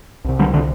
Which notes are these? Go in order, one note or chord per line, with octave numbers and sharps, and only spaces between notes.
C2 C3
D3 G3
D3